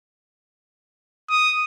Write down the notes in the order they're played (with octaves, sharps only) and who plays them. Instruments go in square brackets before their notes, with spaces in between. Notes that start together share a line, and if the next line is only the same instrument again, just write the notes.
[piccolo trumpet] D#6